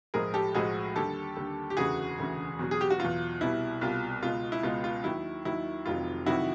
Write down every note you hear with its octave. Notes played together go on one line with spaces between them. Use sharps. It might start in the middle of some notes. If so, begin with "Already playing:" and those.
B1 A2 F3 G#3 G#4 A#4
G4 A4
B1 A2 F3 G#3 F#4 G#4
D#2 D3 G3 G4 A4
D#2 D3 G3
G4
E1 D2 C#3 E3 F#4 G#4
E1 D2 C#3 E3
E2 B2 F#3
G#4
G4
F#4
E2 B2 F#3 F4
C2 B2 G3 E4
C2 B2 G3 F4
C#2 B2 G#3 F4
E4
C#2 B2 G#3 F4
F4
D#2 D#3 F#3 E4
D#2 D#3 F#3 E4
F1 F2 C3 D#3 F#3 F4
F2 C3 D#3 F#3 E4 F#4